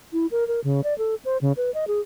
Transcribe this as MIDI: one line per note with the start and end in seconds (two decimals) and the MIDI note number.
0.13 0.26 64
0.31 0.47 70
0.48 0.60 70
0.64 0.81 49
0.84 0.96 74
0.98 1.15 69
1.25 1.38 72
1.41 1.52 49
1.57 1.73 71
1.74 1.85 75
1.88 2.00 68